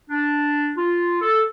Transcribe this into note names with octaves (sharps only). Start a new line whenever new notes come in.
D4
F4
A4